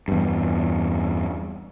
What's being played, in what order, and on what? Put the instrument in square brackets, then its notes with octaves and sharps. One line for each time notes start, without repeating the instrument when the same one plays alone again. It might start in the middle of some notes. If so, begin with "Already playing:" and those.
[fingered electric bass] E2 G2